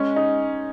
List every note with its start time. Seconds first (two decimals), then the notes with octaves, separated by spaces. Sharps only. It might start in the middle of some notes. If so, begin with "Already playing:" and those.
Already playing: G#3 C#4
0.16 D#4